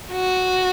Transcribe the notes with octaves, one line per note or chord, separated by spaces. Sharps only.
F#4